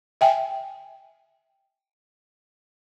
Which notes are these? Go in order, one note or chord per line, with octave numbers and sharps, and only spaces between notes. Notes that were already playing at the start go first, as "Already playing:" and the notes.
E5 G5 G#5